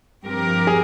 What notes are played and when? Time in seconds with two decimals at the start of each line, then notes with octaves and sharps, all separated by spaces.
0.25 G2 F3 C4 G4 A#4
0.67 G#4